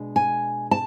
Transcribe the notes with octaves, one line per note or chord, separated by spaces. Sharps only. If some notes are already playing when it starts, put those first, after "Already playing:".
Already playing: B2 G#3 D4
G#5
A5